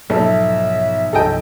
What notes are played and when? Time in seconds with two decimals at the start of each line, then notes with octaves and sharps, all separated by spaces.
0.10 B1 G#2 B2 F3 A4 E5
1.13 C2 G2 F3 A4 D#5 G5